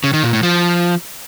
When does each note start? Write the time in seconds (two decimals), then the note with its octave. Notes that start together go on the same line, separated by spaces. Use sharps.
0.04 C#3
0.14 D#3
0.23 A#2
0.33 A2
0.43 F3